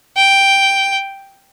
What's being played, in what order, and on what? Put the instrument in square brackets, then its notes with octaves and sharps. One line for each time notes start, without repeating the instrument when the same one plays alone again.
[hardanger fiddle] G5